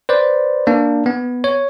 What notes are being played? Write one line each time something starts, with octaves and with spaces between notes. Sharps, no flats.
B4 C5 D5
A#3 D4
B3
C#5